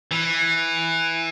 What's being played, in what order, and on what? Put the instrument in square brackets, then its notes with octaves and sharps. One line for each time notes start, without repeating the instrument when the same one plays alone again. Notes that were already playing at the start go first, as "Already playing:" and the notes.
[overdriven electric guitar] E3